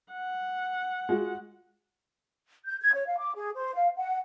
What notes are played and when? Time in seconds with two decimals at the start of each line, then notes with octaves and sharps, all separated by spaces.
0.13 F#5
1.09 G#3 F4 F#4
2.66 G6
2.81 G#6
2.94 C#5
3.07 F5
3.19 D6
3.35 G#4
3.56 C5
3.75 F5
3.97 F#5